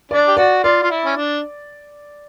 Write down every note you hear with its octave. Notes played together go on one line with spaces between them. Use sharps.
D4 D5
G4
F#4 D5
F4 D5
F4
E4
C#4
D4